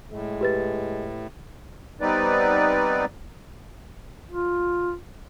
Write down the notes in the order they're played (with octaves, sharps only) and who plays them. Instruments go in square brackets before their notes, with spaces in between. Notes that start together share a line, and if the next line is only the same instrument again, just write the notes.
[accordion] A2 [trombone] G#3
[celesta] G4 B4 A6
[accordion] G3 B3 C4 D#4 B4 D5
[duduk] F4